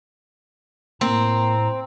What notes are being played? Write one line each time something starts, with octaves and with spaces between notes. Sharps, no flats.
A2 A#3 C4 A#5